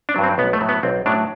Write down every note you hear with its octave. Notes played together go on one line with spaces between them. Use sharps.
D4
G2 F#3
C4
B1 B3
A3
A2 F#3
B3
B1 C4
A2 F#3 D4